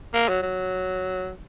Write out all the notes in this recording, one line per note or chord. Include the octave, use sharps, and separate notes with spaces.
A#3
F#3
F#3